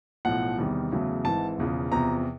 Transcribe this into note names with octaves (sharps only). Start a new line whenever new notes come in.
B1 A2 F3 F#5
E2 C3 D#3 G3
E2 C#3 F#3 A3
G#1 G#2 E3 A5
E1 E2 C#3 F3
E2 C3 F3 A#5